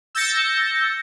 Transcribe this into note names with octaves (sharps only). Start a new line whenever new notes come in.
E6 G6 A6 A#6 C#7